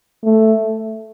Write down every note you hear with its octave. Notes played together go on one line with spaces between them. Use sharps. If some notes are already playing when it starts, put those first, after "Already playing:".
A3